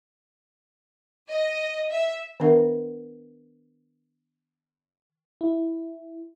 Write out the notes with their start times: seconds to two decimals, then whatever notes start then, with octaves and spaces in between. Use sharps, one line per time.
1.29 D#5
1.90 E5
2.40 D#3 B3 D4 A#4 E5 F#5
5.41 E4